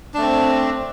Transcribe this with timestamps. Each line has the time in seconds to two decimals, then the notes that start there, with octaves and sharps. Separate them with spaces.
0.14 D4
0.18 A3
0.21 C4